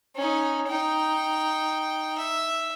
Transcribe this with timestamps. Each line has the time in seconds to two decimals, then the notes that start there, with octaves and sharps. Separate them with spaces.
0.16 C#4 D#4
0.68 D#4 G5
2.18 E5